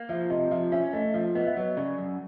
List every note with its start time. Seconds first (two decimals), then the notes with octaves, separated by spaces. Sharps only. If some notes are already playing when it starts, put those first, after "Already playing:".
Already playing: A#3
0.09 F3 E5
0.30 C3 D#5
0.51 F3 E5
0.72 C#4 E5
0.93 A3 D#5
1.14 F3 E5
1.35 B3 D#5
1.46 E5
1.57 F#3 D#5
1.77 C#3 D5
1.98 F#2